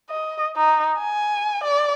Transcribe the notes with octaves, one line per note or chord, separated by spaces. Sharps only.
D#5
D#4
G#5
D5